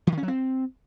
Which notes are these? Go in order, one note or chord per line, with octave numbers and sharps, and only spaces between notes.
E3
D#3
C#4
F#3
C4